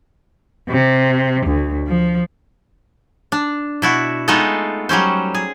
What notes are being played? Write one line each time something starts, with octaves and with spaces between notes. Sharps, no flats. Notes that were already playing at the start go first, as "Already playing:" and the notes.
C3
D2
F3
D4
B2 E4 F#4
G#3 A3 B3 D#4 F4 A4
F#3 G3 C#4 C5
G#4